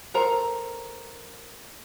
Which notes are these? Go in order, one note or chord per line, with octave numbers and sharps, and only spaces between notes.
A4 A#4 C5 A#5